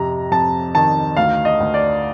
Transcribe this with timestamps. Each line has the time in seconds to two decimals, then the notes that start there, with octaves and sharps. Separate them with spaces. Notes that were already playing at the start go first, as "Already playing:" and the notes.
Already playing: F2 C3 A#5
0.31 F2 A5
0.75 D#3 A5
1.17 D2 F5
1.45 D#5
1.60 D2
1.74 D5